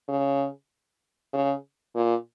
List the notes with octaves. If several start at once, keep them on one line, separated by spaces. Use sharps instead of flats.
C#3
C#3
A#2